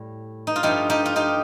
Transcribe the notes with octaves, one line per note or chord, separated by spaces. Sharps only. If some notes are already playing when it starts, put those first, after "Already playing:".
Already playing: A2 G3
D#4
F4
G2 F3 A3 D#4 G4
D#4 G4
F4
D#4 G4